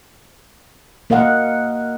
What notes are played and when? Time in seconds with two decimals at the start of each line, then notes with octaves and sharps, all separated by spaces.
1.10 A#3 A#4 D#5 F5 F#5